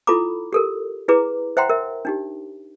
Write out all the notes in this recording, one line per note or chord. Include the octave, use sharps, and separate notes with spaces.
E4 F4 A4 A#5 B5 D6
G4 A4 A#4
E4 G#4 B4 A#5 D6
C5 E5 F#5 G5 A#5 C6
A#4 E5
D4 D#4 G4